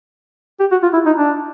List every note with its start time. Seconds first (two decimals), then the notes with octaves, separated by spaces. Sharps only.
0.60 G4
0.71 F#4
0.83 F4
0.93 E4
1.06 D#4
1.17 D4